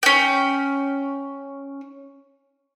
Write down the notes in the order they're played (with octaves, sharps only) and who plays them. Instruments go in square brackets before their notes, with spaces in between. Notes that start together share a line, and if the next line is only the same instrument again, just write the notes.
[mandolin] C#4 G5